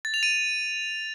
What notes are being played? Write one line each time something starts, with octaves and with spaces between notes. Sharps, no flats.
A6
F7
D#7